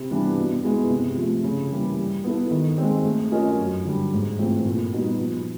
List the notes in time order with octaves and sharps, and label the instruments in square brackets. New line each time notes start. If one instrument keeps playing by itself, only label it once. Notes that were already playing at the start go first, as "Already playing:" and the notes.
Already playing: [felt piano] C3
E3 G3 B3 D4
B2
G#3 B3 E4 G#4
C3
F3 A3
C#3
E3 G3 A#3
G3
B3 E4 A4
D#3
G#3 C4
A3
C#4 F4 A#4 D#5
F#2
D3 G3
G#2
E3 A3 C4 F4
A#2
G3 B3 D#4 F#4
F3